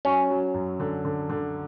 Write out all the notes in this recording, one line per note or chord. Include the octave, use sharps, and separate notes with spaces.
F#3 C#4
F#3
F#2
D3
D3
D3